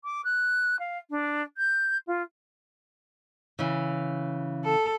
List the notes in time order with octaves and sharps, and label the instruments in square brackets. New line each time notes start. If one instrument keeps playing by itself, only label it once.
[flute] D6
F#6
F5
D4
G6
F4
[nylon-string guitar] C#3 E3
[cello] A4